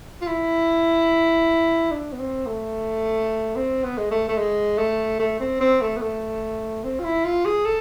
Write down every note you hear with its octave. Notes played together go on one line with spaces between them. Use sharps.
F4
E4
D4
B3
C4
A3
C4
B3
G#3
A3
A3
G#3
A3
A3
C4
C4
A3
B3
A3
C4
F4
E4
F4
G#4
A4